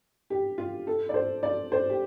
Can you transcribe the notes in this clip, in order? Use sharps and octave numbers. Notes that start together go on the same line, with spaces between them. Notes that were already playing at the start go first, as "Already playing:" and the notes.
G4
F4
A4
D5
C5
D5
C5
G4